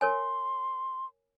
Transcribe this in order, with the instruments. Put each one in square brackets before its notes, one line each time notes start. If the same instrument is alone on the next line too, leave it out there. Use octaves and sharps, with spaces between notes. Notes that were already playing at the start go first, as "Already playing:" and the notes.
[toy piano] A#4 C#5 G#5 [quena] C6